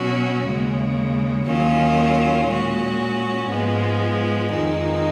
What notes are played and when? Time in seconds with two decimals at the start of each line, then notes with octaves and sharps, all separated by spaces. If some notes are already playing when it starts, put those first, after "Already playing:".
Already playing: B2 F#3 C#4 F#4
0.43 D#2 C#3 G#3
1.46 D#2 D#3 F#3 C#4 F4
2.47 A#2 G#3 C#4 F#4
3.49 G#2 F3 G#3 B3
4.51 F2 D#3 G#3 D#4